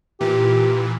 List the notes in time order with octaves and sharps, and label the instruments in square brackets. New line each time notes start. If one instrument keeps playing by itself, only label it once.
[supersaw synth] A#2 E3 [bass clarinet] G4